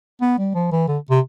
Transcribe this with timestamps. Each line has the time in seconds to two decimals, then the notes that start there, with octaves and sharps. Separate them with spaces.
0.21 B3
0.38 G3
0.55 F3
0.72 E3
0.88 D3
1.10 C3